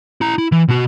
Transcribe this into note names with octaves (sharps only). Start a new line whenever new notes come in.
E4 A#5
E4
E3
B2 F#4